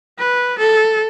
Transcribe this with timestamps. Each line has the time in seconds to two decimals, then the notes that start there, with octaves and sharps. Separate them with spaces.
0.18 B4
0.59 A4